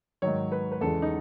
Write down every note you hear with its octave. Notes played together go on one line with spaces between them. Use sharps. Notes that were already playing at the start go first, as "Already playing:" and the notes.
G#2 D#3 F#3 C#5
B4
B4
E2 C#3 E3 G#3 A4
D#4